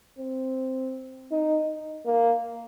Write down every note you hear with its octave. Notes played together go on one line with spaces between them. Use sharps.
C4
D#4
A#3